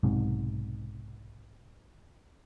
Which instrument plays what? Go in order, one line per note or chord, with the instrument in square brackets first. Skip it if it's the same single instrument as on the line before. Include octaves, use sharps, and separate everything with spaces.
[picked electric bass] B1 G#2 C3